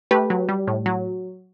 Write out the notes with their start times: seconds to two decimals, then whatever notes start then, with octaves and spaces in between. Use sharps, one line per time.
0.11 A3 G4 B4
0.30 F#3
0.49 G3
0.68 A2
0.86 F#3